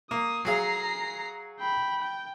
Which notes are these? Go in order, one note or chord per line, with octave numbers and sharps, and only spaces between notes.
A#3 D#6
F#3 G#4 F5 A#5 C7
G5 B5
G5